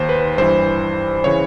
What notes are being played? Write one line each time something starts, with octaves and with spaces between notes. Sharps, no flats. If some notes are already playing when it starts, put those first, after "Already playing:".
Already playing: D#2 D#3 C5
B4
G2 E3 C5
C#3 E3 C#5